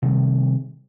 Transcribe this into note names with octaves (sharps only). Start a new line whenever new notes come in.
C3 D#3 G3